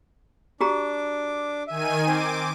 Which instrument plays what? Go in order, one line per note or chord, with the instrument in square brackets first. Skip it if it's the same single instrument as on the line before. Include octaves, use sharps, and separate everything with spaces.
[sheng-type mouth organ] D4 D6 [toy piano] F#4 G4 A#5
[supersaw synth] D#3 G#5 D#7 [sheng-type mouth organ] E5
[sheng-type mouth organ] C4 C5 [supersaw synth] D6